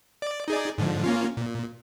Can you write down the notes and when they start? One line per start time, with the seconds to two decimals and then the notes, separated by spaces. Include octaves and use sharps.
0.22 D5
0.48 D#4 G#4 D5
0.78 G#2 D3 F3
1.04 A#3 C#4 F4
1.37 A#2